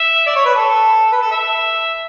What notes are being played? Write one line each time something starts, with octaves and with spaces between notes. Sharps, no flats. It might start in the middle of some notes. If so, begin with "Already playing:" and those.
Already playing: E5
D5
C#5
B4
A4
B4
A4
E5